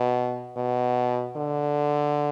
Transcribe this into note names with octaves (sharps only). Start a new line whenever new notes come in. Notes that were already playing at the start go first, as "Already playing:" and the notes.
Already playing: B2
B2
D3